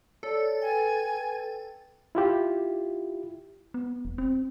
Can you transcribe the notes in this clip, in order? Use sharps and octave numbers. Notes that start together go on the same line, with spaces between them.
A4 C#5 D5
B4 G5 G#5
E4 F4 G4
B3
E1
C4